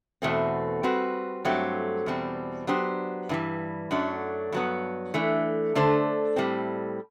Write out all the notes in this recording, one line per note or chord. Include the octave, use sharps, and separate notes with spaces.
E2 B2 A3 C4
G3 C4 F#4 B4
G2 F#3 A3 C4 G4
E2 B2 G3 C4
F#3 B3 D4 G4 C5
G2 E3 G3
F#2 F#3 A3 D4
G2 F#3 B3
E3 A3 D4
D3 A3 D4 A4 C5
A2 G3 C4